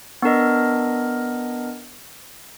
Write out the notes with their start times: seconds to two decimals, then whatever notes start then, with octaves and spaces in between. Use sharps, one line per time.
0.22 B3 D4 A#4 D#5